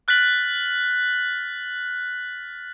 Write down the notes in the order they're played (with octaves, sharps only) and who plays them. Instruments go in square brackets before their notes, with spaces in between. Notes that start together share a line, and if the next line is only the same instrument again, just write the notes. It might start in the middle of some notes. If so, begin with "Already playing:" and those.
[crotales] F6 F#6 A6 B6 F#7